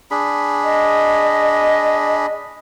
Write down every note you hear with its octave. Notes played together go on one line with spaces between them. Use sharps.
D4 G#4 B5
D#5